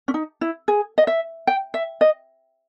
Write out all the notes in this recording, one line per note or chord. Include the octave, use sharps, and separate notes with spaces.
C#4
D#4
E4
G#4
D#5
E5
G5
E5
D#5